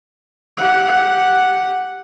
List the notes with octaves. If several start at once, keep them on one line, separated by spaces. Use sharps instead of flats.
G4 F#5